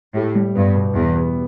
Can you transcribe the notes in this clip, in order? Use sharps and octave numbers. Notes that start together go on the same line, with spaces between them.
A2 G4
G3
G2 B3
B2
E2 B3
B3